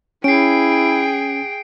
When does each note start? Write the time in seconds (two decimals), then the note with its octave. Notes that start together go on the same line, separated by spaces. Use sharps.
0.24 C#4 E4 G#4 G5 C7 D7